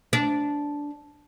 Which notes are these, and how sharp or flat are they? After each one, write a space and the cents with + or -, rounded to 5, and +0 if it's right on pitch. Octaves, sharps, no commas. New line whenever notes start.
D4 -10